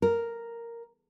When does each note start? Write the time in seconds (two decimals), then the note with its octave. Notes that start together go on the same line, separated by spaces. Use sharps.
0.02 A#4